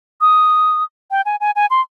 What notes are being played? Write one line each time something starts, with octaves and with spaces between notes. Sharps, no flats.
D#6
G5
G#5
G#5
G#5
C6